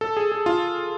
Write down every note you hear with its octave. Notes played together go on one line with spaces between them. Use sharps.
A4
G#4
G#4
F4